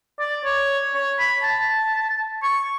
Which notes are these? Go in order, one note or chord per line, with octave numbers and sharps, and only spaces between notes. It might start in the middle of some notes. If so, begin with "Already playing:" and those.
D5
C#5
C#5
B5
A5
C#6